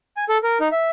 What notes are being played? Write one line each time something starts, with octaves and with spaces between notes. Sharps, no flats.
G#5
A4
A#4
D#4
E5